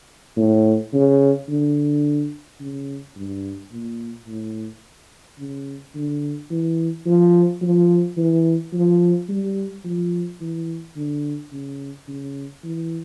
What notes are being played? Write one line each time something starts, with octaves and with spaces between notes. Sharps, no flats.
A2
C#3
D3
C#3
G2
A#2
A2
C#3
D3
E3
F3
F3
E3
F3
G3
F3
E3
D3
C#3
C#3
E3